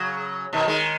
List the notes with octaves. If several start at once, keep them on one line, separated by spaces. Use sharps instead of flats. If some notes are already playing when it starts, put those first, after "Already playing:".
Already playing: C#3 F#3
B2 D#3
D#3 G#3